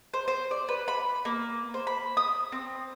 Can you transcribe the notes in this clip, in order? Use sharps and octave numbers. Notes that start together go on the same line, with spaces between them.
C5
C5
D5
B4
B5
A#3
C5
B5
D#6
C4